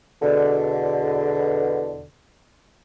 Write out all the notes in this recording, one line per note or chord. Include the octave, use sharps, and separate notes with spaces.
E2 B2 D3